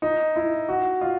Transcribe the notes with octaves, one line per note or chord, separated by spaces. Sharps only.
D#4
E4
F#4
F4